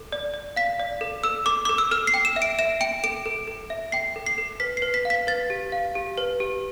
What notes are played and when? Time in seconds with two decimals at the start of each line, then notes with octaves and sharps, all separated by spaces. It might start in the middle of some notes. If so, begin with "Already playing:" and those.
Already playing: A4
0.12 D5
0.34 D5
0.56 F5 B6
0.80 D5
1.01 A4
1.24 A4 E6
1.46 A4 D6
1.65 A4 D6
1.78 E6
1.91 A4 F6
2.07 C7
2.14 G5
2.25 E7
2.36 E5
2.42 D7
2.59 E5 E7
2.81 G5 D7
3.04 A4 D7
3.26 A4
3.48 A4
3.70 E5
3.92 G5 C7
4.16 A4
4.26 C7
4.38 A4
4.60 B4 B6
4.77 C7
4.82 B4
4.94 B6
5.05 F5
5.10 B6
5.27 B4 A6
5.50 G4
5.72 F5
5.95 G4
6.18 B4
6.40 G4